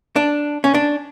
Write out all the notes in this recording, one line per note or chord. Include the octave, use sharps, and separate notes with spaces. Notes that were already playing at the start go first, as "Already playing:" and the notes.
D4
C#4
D4